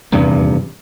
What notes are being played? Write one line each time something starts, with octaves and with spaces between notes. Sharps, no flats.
D#1 E2 G2 C3